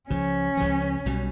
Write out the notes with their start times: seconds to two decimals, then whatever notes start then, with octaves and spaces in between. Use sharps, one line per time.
0.09 C#2 C#3 F3 C#4
0.57 C#2 C#3 F3
1.06 B1 B2 G3